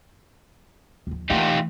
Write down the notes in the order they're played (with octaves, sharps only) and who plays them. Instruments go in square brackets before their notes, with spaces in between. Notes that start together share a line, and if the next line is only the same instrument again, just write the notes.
[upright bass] D#2 F3
[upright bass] E3 A3 [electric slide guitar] D#4 F4 G4